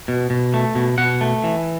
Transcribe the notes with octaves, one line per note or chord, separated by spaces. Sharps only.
B2
B2
A3
B2
B2 F#5
A3
E3